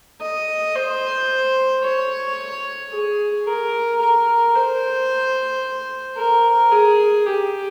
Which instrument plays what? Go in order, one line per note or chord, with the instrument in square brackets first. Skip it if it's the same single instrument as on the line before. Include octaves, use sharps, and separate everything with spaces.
[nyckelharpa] D#5
C5
C#5
G#4
A#4
A#4
C5
A#4
G#4
G4